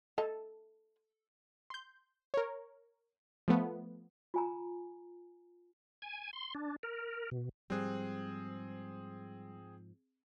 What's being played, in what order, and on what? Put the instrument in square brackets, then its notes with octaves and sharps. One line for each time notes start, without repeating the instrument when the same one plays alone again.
[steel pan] A4 [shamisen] D#5 A5
[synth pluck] C6 G6
A#4 C#5
F3 A3 B3
[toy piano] F4 G#5 A#5
[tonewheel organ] G#5
C6
D4
A#4
B2
[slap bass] G#2 F3 [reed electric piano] G3 F#6 [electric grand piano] C4 G#4